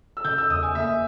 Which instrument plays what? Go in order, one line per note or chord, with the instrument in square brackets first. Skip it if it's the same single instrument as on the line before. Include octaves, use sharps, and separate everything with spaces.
[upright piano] E6
[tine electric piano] C#3 [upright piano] G6
[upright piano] E6
[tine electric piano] E2 [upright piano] D#6
[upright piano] G#5
[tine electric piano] A#3 [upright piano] E5